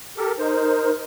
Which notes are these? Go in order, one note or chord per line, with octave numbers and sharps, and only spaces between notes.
G4 A4 A#4
D#4 A#4 C5